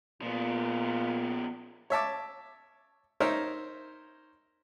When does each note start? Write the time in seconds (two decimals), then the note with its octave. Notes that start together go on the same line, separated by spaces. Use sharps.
0.22 A#2 F3 B3
1.90 C#5 E5 A5 D6
3.20 D#4 A#4 C5 C#5 E5